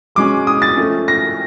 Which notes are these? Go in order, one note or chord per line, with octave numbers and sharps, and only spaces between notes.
B2 G#3 C#4 D6
D#6
A6
F3 A3 C#4
A#6